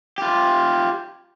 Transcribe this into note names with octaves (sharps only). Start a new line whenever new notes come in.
F4 G4